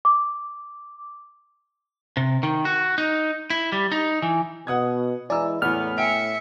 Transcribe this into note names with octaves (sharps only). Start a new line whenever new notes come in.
D6
C3
D#3
F#4
D#4
E4
G3
D#4
E3
B2 F#5 D#6 G#6
E3 G#3 E4 D5 G#5 A#5 E6
E2 A2 E3 B3 F6
E5 G5 G#5 C#7 D7